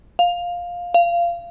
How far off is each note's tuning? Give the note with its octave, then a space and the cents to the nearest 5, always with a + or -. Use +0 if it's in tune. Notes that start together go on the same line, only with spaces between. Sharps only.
F5 +10
F5 -20